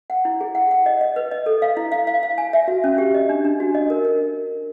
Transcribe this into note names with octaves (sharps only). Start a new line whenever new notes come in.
F#5
E4
G#4
F#5
F#5
D#5
D#5
B4
D#5
A4
F5
E4
F5
F5
F5
G#5
E5
F#4
C#4
G4
D#5
D4
D4
F#4
D#5
A#4
A#4